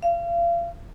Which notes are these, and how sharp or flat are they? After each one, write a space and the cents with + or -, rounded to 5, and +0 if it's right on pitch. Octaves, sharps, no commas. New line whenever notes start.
F5 -35